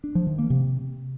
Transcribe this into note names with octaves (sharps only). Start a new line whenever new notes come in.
D4
F3
D#3
A#3
C3